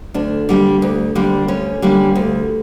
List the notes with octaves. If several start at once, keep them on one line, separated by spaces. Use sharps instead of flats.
D2 D4
D3 G3 A#3
D2
D3 G3 A#3
D2 C#4
D3 G3 A#3
D2